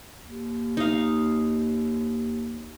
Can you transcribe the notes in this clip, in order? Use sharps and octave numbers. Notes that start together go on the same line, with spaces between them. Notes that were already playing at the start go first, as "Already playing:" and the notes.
D#2
D#4 F5